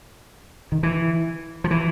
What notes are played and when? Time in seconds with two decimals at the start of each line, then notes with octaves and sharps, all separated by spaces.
0.72 D#3
0.83 E3
1.64 F3
1.71 E3